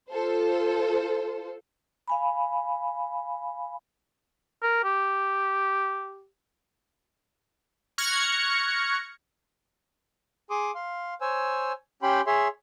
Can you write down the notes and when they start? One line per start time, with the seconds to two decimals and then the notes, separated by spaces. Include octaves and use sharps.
0.10 F4 A4 C5
2.08 F5 G#5 B5
4.62 A#4
4.84 G4
7.98 C#6 F6 F#6 G#6 A#6 C#7
10.50 G#4 C6 D6 D#6
10.75 F5 C6
11.21 C5 C#5 G#5 E6
12.02 C#4 G4 G5 B5 C6
12.27 G#4 C#5 E5 C6